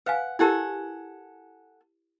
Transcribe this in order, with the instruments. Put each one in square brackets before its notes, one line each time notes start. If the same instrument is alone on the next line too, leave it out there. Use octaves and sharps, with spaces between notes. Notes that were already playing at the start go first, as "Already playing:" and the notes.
[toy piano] B4 F5 G#5 [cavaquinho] F#5
[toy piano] E4 G4 A#4 [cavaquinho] A4 F#5 G#5